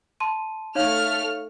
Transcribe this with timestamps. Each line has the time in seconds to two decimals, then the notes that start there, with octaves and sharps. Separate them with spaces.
0.20 A5 C6 D#7
0.75 A3 D#4 C#5 F5 F6